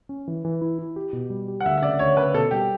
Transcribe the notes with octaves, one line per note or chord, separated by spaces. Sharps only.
C#4
E3
E3
E4
E4
G4
B2
G3
G4
F#5
D2 E5
E5
C#3 D5
D2 C#5
C#3 B4
B2 A4
G3 G4